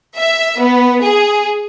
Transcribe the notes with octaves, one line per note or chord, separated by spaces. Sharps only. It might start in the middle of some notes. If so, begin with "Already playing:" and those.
E5
B3
G#4